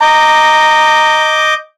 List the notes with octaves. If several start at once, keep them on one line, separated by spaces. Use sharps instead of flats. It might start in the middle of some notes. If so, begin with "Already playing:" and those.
D#5 A#5 D6 G6